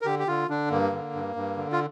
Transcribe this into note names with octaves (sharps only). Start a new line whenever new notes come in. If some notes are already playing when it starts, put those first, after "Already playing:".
A#4
D3 G4
G4
D3 F4
D3 D4
G2 A#3
D3
G2
G2
D3
F4